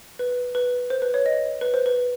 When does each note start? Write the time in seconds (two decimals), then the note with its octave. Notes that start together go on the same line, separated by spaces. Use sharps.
0.19 B4
0.55 B4
0.90 C5
1.02 B4
1.14 C#5
1.26 D#5
1.61 B4
1.74 C5
1.86 B4